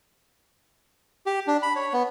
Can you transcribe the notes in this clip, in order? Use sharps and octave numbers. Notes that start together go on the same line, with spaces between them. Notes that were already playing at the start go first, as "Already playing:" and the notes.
G4
D4
B5
C#5
B3